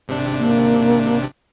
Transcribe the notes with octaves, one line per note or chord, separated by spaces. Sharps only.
G#1 C3 D4
A#3